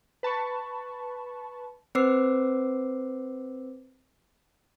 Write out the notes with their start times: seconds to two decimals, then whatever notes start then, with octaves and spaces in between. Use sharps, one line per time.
0.23 B4 A5 B5 C#6
1.95 C4 B4 C5 D6 E6 C7